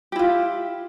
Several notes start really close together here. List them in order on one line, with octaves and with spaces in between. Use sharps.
G4 E4 F4